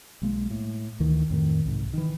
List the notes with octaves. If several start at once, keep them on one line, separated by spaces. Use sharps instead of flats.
B1 G#3 A#3
A2
D2 D#3 E3
F2 A2 D#3
C2 G#2
D#3 E3